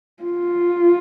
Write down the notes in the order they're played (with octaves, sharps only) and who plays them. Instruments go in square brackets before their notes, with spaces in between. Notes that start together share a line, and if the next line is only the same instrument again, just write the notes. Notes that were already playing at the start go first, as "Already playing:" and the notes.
[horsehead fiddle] F4